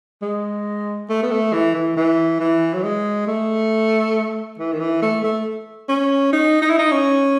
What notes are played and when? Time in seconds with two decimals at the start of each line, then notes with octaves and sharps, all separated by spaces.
0.22 G#3
1.10 A3
1.23 B3
1.31 A3
1.53 E3
1.75 E3
1.97 E3
2.40 E3
2.74 F#3
2.84 G#3
3.28 A3
4.59 E3
4.72 D#3
4.80 E3
5.02 A3
5.24 A3
5.89 C#4
6.33 D#4
6.62 D#4
6.70 E4
6.79 D#4
6.92 C#4